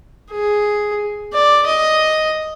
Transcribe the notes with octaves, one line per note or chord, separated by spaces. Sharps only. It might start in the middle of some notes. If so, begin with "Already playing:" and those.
G#4
D5
D#5